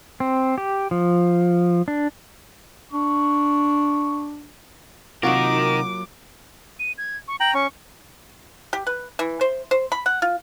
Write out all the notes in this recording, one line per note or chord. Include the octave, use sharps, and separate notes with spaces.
C4
G4
F3
D4
D4 C#6
C3 F#3 A#3 D#4 F4 F#4 A#4 D6
D#7
G#6
C#6
G5 A#5 F#7
C#4 C#6
G4
B4
E3
C5
C5
B5
F#5
F4